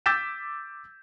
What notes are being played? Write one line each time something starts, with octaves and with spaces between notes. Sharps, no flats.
D6 E6 G6 A6 B6 E7